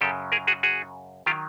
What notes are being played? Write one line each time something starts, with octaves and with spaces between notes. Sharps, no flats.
F#2 C#3 F#3 G4 A4
G#4 A#4
F#4 G#4
F#4 G#4
D#3 F#3 F4 G4